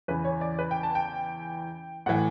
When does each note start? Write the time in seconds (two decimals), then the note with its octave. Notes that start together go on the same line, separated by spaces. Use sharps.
0.08 E2 C#3 E3 B4
0.25 C#5
0.41 D5
0.59 B4
0.71 G5
0.83 A5
0.95 G5
2.06 A2 E3 F#5